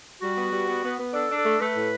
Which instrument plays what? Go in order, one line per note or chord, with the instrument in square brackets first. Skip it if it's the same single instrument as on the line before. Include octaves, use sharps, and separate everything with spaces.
[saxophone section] G3 [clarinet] F#4
[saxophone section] B3
G3
B3
B3
B3
[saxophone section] D4 [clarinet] A4
[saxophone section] D4
[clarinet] A4
[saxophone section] A3
[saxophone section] A3 [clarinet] B4
[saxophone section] A2